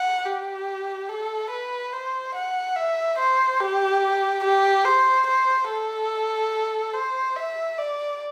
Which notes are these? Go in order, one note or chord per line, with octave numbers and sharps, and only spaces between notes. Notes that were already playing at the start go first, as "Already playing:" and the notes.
Already playing: F#5
G4
A4
B4
C5
F#5
E5
C5
G4
G4
C5
C5
A4
C5
E5
D5